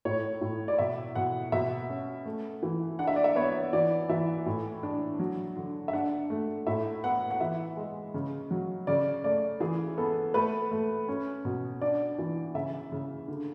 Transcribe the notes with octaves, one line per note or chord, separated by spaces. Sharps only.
A2 C#5
A2
D5
B2 E5
B2 F#5
B2 E5
C#4
A3
E3
D4 F#5
E5
D5
E5
B3 C#5
E3 D5
E3 E5
A2
D4
F#3
D3
E5
D4 F#5
A3
A2 E5
B3 F#5
F#5
E3 E5
G#3
C#3
F#3
C#3 D5
A3 D5
E3 G#4
B3 A4
A3 B4
A3
C#4
B2
D4 D5
E3
C#3 E5
C#3
D3